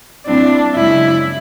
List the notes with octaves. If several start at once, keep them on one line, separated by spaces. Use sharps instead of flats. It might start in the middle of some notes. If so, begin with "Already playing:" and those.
A#2 G3 C4 D4 E4
F#2 C#3 F3 G#3 E4